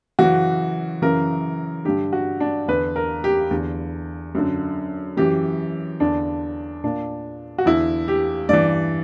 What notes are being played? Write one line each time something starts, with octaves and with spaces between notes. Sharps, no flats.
F#2 C#3 E3 F#4
F#2 C#3 E3 A#4
G2 D3 G4
F#4
D4
E2 D3 B4
A#4
G4
E2 D3
F#2 D3
F#2 E3 G4
E2 D3 D4
A#2 D4
F#4
E2 D3 E4
G4
G2 E3 D5